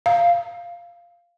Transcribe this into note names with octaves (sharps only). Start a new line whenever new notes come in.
F5